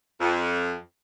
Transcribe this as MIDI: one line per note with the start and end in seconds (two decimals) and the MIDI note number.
0.21 0.74 41